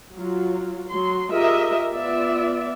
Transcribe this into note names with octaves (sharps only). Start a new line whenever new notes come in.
F#3 F4
F#3 C6
F4 G4 G#4 A#4 D#5 E5
B3 F4 D5 E5